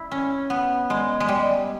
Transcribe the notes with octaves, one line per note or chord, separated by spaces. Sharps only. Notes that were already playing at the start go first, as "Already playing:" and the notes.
Already playing: E4
C#4
B3
G#3
G#3
G3